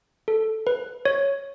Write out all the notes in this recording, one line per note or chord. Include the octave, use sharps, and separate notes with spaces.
A4
B4
C#5